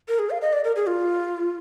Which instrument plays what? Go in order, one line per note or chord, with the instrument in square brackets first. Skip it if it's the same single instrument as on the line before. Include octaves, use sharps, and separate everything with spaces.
[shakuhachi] A#4
G#4
F5
D#5
D5
A#4
G#4
F4